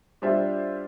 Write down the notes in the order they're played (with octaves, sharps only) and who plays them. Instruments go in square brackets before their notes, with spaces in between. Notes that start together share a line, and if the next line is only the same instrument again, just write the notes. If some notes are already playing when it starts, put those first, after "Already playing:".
[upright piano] G3 D4 F4 C5 E5